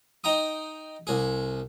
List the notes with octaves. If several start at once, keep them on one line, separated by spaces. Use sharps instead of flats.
D#4 G5 A#5 D#6
C2 G#4